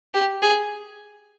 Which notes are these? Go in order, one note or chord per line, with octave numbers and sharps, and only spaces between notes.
G4
G#4